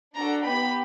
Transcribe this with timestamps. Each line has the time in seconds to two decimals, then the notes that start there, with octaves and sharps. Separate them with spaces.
0.15 D4 F#4 A4 A#5
0.45 B3 D#4 G4 B5